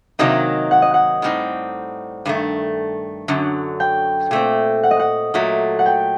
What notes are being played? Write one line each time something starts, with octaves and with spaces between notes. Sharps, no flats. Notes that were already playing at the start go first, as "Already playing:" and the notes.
C3 D#3 F#3 A#3 D#4 D#5
F#5
D#5
F#5
A2 G3 C4 D#4
G2 D#3 A3
F#2 D3 F#3
G5
A#2 A3 C4
F#5
D#5
F#5
A#2 F#3 A3
F#5
G5